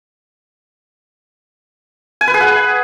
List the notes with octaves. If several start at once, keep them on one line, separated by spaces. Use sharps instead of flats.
G#5
B4
G#4
F#5